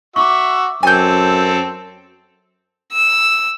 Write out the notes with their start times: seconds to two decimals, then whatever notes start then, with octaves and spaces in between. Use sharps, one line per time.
0.16 F#4 E5 C#6 D6 E6
0.83 F#2 C4 A4 G#5 G6
2.92 E6